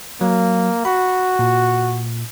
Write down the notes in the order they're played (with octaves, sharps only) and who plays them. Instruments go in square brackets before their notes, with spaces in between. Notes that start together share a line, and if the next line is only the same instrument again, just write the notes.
[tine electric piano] F#3 [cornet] A#3
[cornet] F#4 [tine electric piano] B5
[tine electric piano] A#2